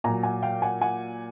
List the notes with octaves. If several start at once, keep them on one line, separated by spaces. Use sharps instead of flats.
A#2 F#3 G#5 A#5
F#5 G#5
F5 G5
F#5 G#5
F#5 G#5